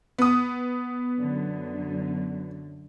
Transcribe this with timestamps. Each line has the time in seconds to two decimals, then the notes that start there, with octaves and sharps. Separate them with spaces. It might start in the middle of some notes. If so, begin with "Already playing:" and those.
0.18 B3 D#6
1.17 F#2 D3 F#3